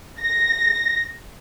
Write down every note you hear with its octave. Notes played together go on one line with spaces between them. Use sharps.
A#6